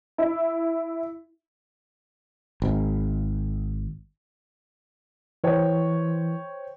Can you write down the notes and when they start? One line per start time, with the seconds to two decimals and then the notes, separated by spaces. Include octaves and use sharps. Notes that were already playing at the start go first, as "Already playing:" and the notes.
0.18 E4
2.62 G#1
5.44 E3 C5 C#5 G5